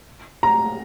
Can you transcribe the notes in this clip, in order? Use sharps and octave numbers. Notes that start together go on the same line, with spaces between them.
A#5